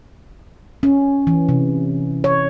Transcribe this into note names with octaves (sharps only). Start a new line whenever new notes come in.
C#4
E3
C3
C#5